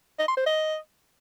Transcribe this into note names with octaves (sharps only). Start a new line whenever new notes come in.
D#5
C6
C5
D#5